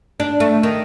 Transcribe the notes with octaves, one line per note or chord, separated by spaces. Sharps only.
D4
A3
D#3